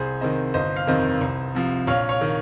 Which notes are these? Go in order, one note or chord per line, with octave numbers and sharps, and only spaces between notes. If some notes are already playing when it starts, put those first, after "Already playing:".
Already playing: C2 G#4 C5
C3 D#3 C5 D#5
G1 C5 D#5
F5
F2 C3 D#3 C5 D#5
C2
C3 F3
A#1 C#5 F5
C#5 F5
D#3